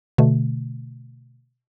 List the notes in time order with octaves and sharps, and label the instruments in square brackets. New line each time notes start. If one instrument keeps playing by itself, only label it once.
[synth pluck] B2 D3 A3